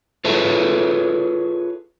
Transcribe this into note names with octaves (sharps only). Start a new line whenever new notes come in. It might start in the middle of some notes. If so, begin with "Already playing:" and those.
F4 G#4 A4 B4 C#5 E5